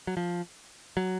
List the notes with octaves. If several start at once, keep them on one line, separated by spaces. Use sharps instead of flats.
F#3
F3
F#3